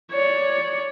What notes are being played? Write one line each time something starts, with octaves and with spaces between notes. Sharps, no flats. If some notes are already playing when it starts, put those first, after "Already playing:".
C#5 D5